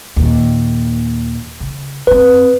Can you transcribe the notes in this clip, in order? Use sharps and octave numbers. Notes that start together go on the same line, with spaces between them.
D#2 A#2
C#3
F#2 C4 B4